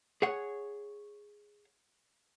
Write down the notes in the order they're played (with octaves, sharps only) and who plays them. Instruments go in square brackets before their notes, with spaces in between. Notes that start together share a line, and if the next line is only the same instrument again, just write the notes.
[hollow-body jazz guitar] G#4 C#5 F#5